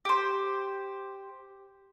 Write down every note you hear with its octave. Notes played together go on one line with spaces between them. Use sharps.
G4 C5